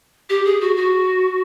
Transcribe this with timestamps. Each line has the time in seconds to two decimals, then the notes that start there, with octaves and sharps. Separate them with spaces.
0.29 G4
0.45 G#4
0.61 F#4
0.77 F#4